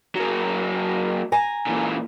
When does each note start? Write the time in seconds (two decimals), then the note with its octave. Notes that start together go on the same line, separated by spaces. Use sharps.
0.15 F#3 A#3
1.32 G#5 A#5
1.67 A#2 E3